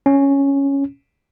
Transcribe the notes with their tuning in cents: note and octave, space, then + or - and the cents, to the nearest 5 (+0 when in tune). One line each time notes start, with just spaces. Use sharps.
C#4 +0